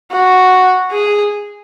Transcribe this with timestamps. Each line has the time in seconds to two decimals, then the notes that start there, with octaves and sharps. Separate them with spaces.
0.12 F#4
0.92 G#4